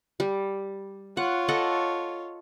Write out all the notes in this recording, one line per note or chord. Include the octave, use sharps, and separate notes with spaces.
G3
F4 C#5 F#5
A4 D#5 F#5